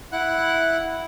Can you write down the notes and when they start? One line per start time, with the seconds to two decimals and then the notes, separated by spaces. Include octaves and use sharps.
0.12 E4 F#5 F#6